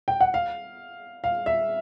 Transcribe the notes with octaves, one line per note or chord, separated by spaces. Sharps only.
G5
F#5
F5
F5
E5